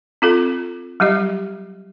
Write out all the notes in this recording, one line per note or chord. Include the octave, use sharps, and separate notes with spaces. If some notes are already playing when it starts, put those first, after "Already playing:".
C4 F4 A4
F#3 G3 G4 D#5